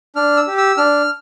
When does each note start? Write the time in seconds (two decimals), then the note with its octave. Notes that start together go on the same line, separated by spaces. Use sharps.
0.16 D4 F6
0.37 E6
0.47 G4
0.58 E6
0.77 D4 F6